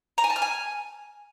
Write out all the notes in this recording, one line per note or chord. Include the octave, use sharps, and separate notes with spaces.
A#5
G#5
A5
F6
G#5